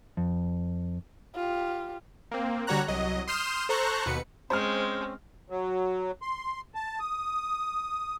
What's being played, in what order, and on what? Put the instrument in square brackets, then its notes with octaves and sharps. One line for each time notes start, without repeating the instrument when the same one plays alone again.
[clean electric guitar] F2
[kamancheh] F4 G4
[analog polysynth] A#3 C4
D3 G3 F#4 C#5 A#5 F#6
C2 F#3 D#5
C6 D#6 F6 G6 C7 E7
A4 C5 A#5 C#6 F#6
D#2 B2 B4 C#7
[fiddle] G#3 [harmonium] C4 C#4 [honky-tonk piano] C5 F6
[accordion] F#3
C6
A5
D#6